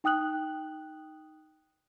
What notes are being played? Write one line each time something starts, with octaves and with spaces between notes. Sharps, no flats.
D#4 G5 D#6 F#6 F#7